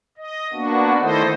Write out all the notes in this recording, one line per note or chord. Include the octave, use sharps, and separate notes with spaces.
D#5
A#3 B3 D4 F#4
D#3 A3 E4 A4 C5 D#5